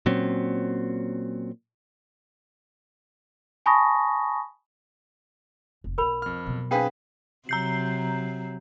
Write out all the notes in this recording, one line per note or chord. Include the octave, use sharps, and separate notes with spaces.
A#2 F#3 C4 C#4
G#5 A5 B5 C#6 D#6 A#6
F1
B1 B2 A#4 B5
F2 F6
B2 F#3
C4 D4 G#4 B4 F5 G5
C3 F#3 A#5 G6 C7